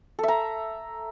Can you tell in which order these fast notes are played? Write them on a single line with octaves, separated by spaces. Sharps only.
A4 E5 A#5